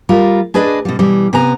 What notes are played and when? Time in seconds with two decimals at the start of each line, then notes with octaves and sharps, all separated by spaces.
0.09 G3 F4 A#4
0.54 D4 G#4 B4 D5 D#5
0.85 B2 G3
0.99 B2 E3 G3
1.33 C3 B3 G#5 A#5